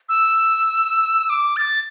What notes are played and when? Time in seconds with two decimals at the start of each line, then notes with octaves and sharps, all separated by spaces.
0.09 E6
1.30 D6
1.57 A6